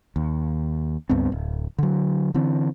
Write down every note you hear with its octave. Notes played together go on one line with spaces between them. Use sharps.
D#2
C#2 G2 B3 C4
D1
D3 F#3
D3 E3 C4